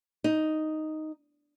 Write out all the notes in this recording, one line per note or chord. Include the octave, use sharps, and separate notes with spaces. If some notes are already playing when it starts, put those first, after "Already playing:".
D#4